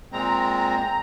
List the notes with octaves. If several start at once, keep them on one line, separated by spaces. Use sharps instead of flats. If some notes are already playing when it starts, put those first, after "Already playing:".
A#2 G#3 C4 A#5